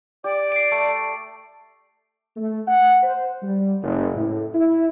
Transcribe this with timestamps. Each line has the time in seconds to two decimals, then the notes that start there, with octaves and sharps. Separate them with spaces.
0.24 G4 D5
0.52 C7 D7
0.71 A3
2.37 A3
2.67 F#5
3.03 C5
3.42 G3
3.82 F#1
4.15 A2
4.54 E4